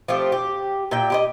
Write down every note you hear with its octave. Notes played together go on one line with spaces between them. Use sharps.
F3 A3 C4 G4
G4
A#2 E5 G5
G4 C5 D#5